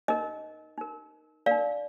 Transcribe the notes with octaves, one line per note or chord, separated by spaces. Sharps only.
D#4 A#4 D#5
D#4 A#4
D#4 A#4 D5 F5